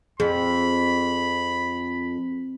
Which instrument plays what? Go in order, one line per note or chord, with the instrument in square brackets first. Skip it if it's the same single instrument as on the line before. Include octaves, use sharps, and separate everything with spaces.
[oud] F2 [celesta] G#4 [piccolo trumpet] B5